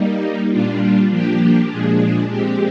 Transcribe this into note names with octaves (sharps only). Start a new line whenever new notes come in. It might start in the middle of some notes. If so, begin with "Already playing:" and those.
Already playing: G3 A#3 D#4
A#2 G3 D4 F4
F3 A#3 D4 G4
A#2 F3 G#3 D4 G#4
A#2 G#3 C4 G4